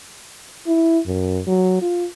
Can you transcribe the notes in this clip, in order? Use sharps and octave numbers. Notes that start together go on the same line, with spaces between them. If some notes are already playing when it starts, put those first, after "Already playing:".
E4
F#2
F#3
F4